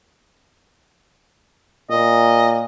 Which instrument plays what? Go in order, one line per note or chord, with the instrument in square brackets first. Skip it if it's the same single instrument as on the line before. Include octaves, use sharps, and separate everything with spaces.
[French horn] A#2 [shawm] D#5